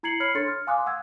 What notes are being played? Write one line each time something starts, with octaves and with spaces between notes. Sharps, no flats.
E4 A#5 G#6 C7 C#7 F#7
C#5 B5 F6 G#6 C7 C#7
D4 A4 C#5 C6 A6 C#7
F6
F5 G#5 C6 D6 D#6 F#6
F#5 E6 F#6 G#6